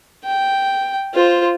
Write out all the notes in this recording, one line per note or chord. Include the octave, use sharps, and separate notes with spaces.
G5
F4 C5